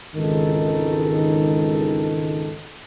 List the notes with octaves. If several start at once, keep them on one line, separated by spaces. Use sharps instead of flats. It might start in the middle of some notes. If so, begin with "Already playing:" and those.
G#1 C#2 D#3 E3 D#4 A4